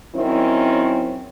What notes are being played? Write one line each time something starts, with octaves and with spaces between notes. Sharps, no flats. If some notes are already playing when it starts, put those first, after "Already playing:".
D#3 F#3 C4 C#4 E4